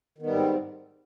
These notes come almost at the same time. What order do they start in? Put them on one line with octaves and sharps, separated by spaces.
D#3 B3 G3 G#2 C4